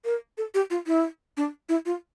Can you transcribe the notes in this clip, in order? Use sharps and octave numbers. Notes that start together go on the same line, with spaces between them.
A#4
A4
G4
F4
E4
D4
E4
F4